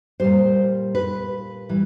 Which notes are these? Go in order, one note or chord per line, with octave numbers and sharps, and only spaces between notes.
A#2 G3 C5
B4
E3 G3